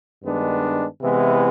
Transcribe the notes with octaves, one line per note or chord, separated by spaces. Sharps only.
G2 D#3 G#3 B3 D4
C3 E3 G#3 B3 E4